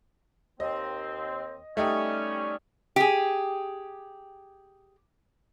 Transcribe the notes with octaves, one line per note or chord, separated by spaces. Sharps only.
D#2 C4 D#5
G3 A3 C#4 D#4 G4
G4 G#4